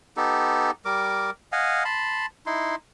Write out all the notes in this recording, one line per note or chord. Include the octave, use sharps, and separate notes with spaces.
B3 D#4 G4 A4
G3 A#4 D6
D#5 F5 F#5 G#5
A5 B5 C6
D#4 E4 C6